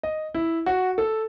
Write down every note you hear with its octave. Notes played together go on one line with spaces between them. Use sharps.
D#5
E4
F#4
A4